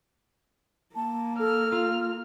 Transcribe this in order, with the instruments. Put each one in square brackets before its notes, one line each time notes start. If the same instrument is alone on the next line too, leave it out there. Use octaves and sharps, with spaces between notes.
[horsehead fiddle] A#3 [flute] A5
[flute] A4 [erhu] F6
[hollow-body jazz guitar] F4